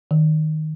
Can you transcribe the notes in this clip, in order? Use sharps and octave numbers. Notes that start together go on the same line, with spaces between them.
D#3